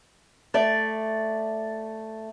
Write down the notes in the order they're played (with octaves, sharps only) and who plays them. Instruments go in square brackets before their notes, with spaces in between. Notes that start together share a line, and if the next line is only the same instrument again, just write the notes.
[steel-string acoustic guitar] A3 D5